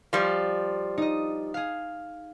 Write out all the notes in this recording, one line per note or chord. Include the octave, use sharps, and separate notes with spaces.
F3 G3
D#4 D#5
G#4 F5